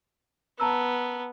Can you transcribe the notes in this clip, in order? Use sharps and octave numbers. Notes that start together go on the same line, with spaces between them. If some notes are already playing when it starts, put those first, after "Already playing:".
B3 A5 A#5 E6